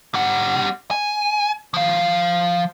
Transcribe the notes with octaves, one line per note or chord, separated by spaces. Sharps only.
G3 F#5
G#5
F3 F5